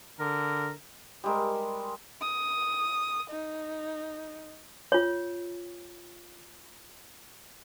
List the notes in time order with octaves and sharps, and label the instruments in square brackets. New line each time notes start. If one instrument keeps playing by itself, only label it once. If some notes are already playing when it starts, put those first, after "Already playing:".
[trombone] D3 [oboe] A#4
[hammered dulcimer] G3 G#3 A#4
[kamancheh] D#6
D#4
[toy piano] F4 C#5